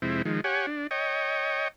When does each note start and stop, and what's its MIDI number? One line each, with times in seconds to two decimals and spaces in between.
0.02 0.22 41
0.02 0.22 48
0.02 0.22 56
0.02 0.22 60
0.02 0.22 64
0.25 0.41 51
0.25 0.41 53
0.25 0.41 56
0.44 0.66 67
0.44 0.66 73
0.44 0.66 78
0.44 0.66 80
0.67 0.87 62
0.91 1.68 73
0.91 1.68 75
0.91 1.68 79